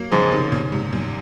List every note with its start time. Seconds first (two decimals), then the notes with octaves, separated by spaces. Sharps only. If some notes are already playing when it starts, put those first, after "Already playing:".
Already playing: F#3 A#3
0.12 G#2 C#3 F3
0.32 C3 D#3
0.52 A#2 C#3
0.72 G#2 C3
0.93 F#2 A#2